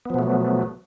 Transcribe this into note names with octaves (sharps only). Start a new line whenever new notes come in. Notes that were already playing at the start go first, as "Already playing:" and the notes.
B2 F3 F#3 A3 B3